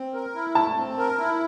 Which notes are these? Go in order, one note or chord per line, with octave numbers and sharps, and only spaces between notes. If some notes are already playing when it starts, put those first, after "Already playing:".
Already playing: C4
A#4
E4
A3 A5
C4
A#4
E4